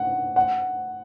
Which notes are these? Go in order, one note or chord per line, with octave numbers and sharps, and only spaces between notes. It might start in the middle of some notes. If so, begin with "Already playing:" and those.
Already playing: F#5
F#5